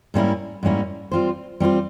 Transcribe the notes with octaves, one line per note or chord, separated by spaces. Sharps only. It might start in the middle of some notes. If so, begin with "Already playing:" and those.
G#2 G3 A#3 C#4 E4
G#2 G3 A#3 C#4 E4
G3 C4 F4 C5
G3 C4 F4 C5